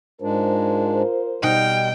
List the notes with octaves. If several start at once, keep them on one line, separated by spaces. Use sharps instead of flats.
G#2 G#3 D4 F4 A#4 C5
B2 G3 D#4 G5 F6